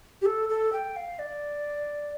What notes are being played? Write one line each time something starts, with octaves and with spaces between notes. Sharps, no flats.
G4
A4
A4
G5
F5
D5